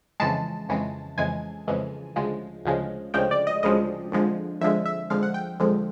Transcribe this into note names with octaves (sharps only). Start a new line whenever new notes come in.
F2 C#3 E3 G#3 A5
F2 C#3 E3 G#3
F2 C#3 E3 G#3 G#5
F2 C#3 E3 G#3
D2 C#3 F3 G#3
D2 C#3 F3 G#3
D2 C#3 F3 G#3 G5
D5
D#5
D2 C#3 F3 G#3 D#5
F2 D3 F3 G#3
F2 D3 F3 G#3 E5
E5
F2 D3 F3 G#3 F5
F#5
G5
F2 D3 F3 G#3